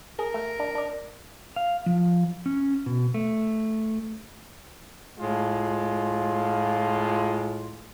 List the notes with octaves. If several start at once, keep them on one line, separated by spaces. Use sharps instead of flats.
G#4 A#4
A3
D4
D4 D5
F5
F3
C#4
B2
A3
A2 G#3 F4